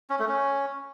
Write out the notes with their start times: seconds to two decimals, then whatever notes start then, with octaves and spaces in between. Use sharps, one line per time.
0.10 C#4
0.19 A3
0.28 C#4